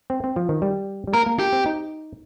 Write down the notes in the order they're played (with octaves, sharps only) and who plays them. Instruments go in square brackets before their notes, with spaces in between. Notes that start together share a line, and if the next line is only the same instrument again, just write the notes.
[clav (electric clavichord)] C4
C4
F3
D#3
G3
G3
[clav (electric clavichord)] A#3 [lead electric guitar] A#4
[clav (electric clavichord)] A#3
[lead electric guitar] G4
[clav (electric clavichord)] C4
D#4